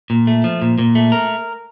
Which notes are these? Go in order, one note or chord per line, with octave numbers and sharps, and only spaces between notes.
A#2
A3
F3
A#2
A#2
A3
A#4